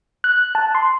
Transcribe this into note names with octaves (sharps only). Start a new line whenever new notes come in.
F#6
A5
C6